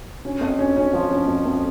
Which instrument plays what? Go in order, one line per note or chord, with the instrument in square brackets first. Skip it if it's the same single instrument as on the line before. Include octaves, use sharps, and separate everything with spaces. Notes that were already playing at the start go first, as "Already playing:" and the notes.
[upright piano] C#4
F2
C#4
C#4
F3
C#4
F2
F2